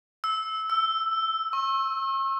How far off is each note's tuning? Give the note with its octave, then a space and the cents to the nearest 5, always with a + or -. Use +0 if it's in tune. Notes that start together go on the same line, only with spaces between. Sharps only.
E6 -15
E6 +5
C#6 -45